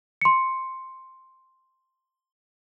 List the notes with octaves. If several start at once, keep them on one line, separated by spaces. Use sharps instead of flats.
C6 C#7